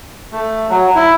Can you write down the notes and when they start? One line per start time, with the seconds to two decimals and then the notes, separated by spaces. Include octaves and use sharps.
0.32 A3
0.69 F#3
0.95 E4